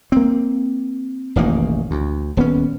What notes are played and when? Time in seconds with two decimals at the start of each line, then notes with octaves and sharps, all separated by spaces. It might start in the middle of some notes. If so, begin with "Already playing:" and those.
0.12 A#3 C4
1.36 E1 A1 D#3 A#3
1.91 D2
2.37 D#1 B3 C#4